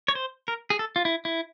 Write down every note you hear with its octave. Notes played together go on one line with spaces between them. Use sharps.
C#5
C5
A#4
G#4
A4
F4
E4
E4